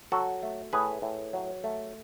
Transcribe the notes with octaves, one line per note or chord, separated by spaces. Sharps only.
F#3 F#4 A4
A3
A2 G#4 B4
A2
F#3
A3